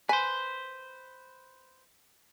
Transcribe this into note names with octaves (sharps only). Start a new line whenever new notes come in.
B4 C5 G#5